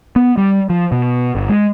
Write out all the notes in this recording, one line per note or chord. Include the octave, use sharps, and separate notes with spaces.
B3
G3
F3
B2
G1
G#3